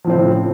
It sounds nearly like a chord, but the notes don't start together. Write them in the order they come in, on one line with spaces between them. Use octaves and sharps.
F3 A2 C4 C#3